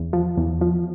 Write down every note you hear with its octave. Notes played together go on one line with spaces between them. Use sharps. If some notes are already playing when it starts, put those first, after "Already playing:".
Already playing: E2
F3
E2
F3